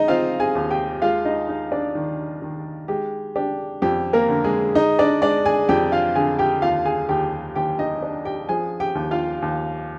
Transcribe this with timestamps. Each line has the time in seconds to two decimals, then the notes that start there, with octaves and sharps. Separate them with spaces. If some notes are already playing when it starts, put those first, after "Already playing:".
Already playing: G#3 D#4 D#5
0.08 C4 F4 F5
0.40 G#4 G#5
0.55 D#2
0.71 G4 G5
1.02 G#3 F4 F5
1.25 D#4 D#5
1.49 D#4
1.72 D4 D5
1.95 D#3
2.42 D#3
2.88 G#3 G4
3.36 D4 G4
3.82 F2 G4
4.13 A#3 A#4
4.29 D3
4.44 G#3 G#4
4.75 G#3 D#4 D#5
4.99 D4 D5
5.22 G#3 D4 D5
5.45 G#4 G#5
5.69 F2 G4 G5
5.92 F4 F5
6.15 D3 G#4 G#5
6.39 G4 G5
6.62 D#2 F4 F5
6.85 G#4 G#5
7.09 D#2 G4 G5
7.55 D#2 G4 G5
7.79 D#4 D#5
8.02 D4
8.25 G4 G5
8.49 F3 G#4 G#5
8.80 G4 G5
8.95 D#2
9.11 F4 F5
9.42 D#2